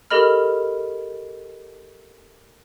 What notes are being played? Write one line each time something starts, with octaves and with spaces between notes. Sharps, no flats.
G4 A4 A#4 D#5 B5 F6